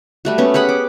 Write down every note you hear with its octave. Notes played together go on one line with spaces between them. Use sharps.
G3 A3 F#4
B3 C#4
G4 G#4 F#5 B5
D6